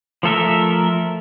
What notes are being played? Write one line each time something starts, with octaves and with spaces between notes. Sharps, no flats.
F3 A3 A4 A#4 E5